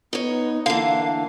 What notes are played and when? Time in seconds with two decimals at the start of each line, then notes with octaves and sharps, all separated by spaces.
0.13 B3 D#4 C#5
0.66 D3 E3 A#3 F5